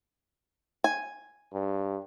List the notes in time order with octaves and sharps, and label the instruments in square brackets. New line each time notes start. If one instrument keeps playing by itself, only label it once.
[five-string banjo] G#5
[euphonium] G2